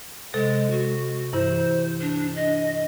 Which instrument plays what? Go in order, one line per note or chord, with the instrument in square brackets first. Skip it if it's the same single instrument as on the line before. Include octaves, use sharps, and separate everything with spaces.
[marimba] C3 A4 [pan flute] G#3
[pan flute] F#4
[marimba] G2 E3 E4 [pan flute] C5
[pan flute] D4
D#5